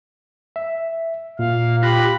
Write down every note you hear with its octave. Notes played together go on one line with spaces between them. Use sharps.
E5
A#2 F5
F4 G4 B5 F#6 A#6